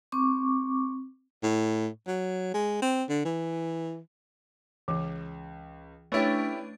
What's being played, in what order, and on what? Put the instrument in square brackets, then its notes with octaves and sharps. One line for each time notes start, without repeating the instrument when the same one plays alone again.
[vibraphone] C4 C#6 D6
[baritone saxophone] A2
F#3
G#3
C4
D3
E3
[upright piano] C#2 [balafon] E3
[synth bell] A3 D4 [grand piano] C#4 E4 G4 [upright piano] B4 C#5